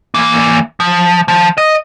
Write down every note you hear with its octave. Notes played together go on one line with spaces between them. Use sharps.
E3 A#3
F3
F3
D#5